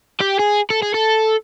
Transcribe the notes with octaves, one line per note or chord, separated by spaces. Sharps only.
G4
G#4
A4
G#4
A4